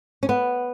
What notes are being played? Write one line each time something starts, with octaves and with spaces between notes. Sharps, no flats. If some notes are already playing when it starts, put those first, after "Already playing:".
C#4
B3